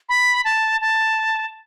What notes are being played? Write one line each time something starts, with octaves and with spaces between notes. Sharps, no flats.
B5
A5
A5